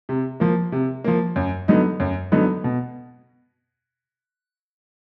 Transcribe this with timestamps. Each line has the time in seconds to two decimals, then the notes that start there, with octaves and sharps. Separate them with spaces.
0.09 C3
0.40 F3 A#3
0.72 C3
1.04 F3 A#3
1.36 F#2
1.68 D3 F#3 B3 D#4
2.00 F#2
2.32 D3 F#3 B3 D#4
2.64 B2